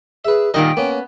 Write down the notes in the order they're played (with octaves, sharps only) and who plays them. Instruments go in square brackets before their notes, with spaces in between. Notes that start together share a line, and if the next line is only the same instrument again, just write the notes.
[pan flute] G#4 [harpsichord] B4 E5
[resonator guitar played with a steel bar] A#2 D#3 G3 [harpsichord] A#4 D#5 F#5 [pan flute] G5
[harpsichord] A#3 C#4 [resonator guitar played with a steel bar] B3